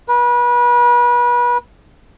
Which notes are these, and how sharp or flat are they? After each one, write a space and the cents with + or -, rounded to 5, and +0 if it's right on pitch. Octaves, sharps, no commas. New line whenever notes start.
B4 -35